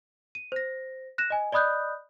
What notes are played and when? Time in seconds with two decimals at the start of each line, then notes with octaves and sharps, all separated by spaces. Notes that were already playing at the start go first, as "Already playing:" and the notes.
0.35 D#7
0.52 C5 A#6
1.18 F#6 A#6 E7
1.30 D#5 G#5
1.52 D5 D#5 B5 D#6 F#6 G6